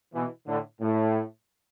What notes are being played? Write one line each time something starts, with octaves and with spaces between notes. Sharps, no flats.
B2 E3
A2 D3
A2